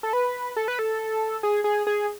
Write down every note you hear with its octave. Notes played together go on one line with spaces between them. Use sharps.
A4
B4
A4
B4
A4
G#4
G#4
G#4